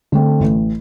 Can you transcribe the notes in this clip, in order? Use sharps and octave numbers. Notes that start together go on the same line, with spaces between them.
D3 A3 C4
A1